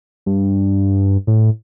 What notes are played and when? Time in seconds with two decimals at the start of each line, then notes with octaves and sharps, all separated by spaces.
0.26 G2
1.27 A2